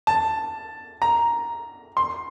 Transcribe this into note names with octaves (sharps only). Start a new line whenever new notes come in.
A5
A#5
C6